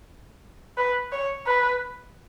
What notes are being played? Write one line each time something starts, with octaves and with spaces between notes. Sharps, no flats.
B4
C#5
B4